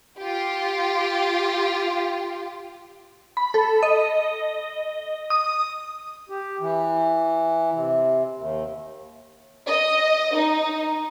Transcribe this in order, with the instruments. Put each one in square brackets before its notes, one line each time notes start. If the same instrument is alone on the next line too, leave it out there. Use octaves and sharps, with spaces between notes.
[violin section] F4 G4
[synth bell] B5
A4
D#5
D#6
[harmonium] G4
E3
C3
D#2
[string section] D#5
D#4